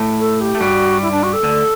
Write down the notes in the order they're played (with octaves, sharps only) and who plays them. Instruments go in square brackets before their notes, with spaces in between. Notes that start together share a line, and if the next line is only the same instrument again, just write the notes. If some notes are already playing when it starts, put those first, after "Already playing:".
Already playing: [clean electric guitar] A2 A3
[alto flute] A4
G4
[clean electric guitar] A3
[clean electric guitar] G2 G3 [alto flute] F#4
[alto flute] E4
D4
F#4
A4
[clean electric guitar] D2 D3